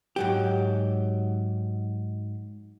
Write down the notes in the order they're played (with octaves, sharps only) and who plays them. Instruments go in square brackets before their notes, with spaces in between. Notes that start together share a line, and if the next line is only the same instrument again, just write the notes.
[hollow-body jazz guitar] G#2 F#3 G4